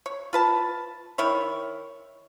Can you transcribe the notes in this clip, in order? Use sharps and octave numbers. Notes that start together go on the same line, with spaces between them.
C#5
F4 B4 A5
D#3 E4 C#5